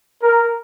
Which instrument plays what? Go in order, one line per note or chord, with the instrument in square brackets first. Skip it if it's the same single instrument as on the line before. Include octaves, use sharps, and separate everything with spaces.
[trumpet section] A#4